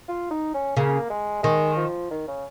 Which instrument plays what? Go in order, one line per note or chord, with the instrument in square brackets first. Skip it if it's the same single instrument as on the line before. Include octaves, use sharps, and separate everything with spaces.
[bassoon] F4
D#4
C#4
[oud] C#3 [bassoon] A#3
[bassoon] G#3
[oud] D#3 [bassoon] G#3
[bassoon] F3
D#3
C#3